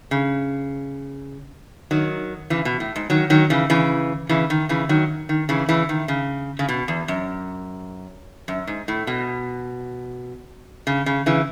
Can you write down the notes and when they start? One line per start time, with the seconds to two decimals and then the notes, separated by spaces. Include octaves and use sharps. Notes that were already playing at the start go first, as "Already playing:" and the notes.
0.11 C#3
1.91 D#3 F#3
2.50 C#3 E3
2.65 B2
2.80 A2
2.96 G#2
3.10 D#3 F#3
3.30 D#3 F#3
3.50 C#3 E3
3.70 C#3 E3
4.29 C#3 E3
4.50 D#3
4.69 C#3 E3
4.89 D#3 F#3
5.29 D#3
5.49 C#3 E3
5.69 C#3 E3
5.89 D#3
6.08 C#3
6.59 C#3
6.68 B2
6.88 E2
7.08 F#2
8.48 F#2
8.67 G#2
8.88 A2
9.07 B2
10.87 C#3
11.06 C#3
11.26 C#3 E3